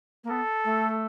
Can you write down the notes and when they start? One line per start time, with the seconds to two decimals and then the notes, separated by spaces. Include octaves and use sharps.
0.24 A#3
0.30 B3 A4
0.64 A3